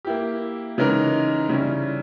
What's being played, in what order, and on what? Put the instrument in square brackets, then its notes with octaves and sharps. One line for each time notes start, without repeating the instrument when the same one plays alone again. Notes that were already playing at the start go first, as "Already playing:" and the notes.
[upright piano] A#3 E4 G4
C#3 E3 G#3 D#4 A#4
C#3 G3 C#4 E4